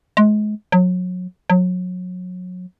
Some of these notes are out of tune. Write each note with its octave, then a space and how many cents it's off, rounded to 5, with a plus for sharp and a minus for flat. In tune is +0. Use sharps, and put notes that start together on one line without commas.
G#3 +30
F#3 -30
F#3 -30